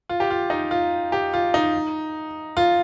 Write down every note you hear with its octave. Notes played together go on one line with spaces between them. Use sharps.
F4
G4
F4
D#4
F4
G4
F4
D#4
F4